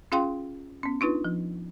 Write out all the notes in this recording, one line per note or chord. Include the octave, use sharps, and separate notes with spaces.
C#4 F4 G#4 F5 G5 C6
B3 C#4
D4 D#4 F4 B4
F3